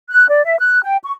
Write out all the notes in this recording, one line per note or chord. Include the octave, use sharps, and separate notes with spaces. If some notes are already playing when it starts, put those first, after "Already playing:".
F#6
D5
E5
F#6
G5
C#6